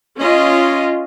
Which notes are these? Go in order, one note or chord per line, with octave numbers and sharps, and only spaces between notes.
C#4 F4 D#5